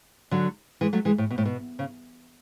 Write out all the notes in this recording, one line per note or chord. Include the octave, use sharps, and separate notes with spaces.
D3 F#3
E3 G#3
F#3 A3
E3 G#3
A2
B2
A2
B2
C#3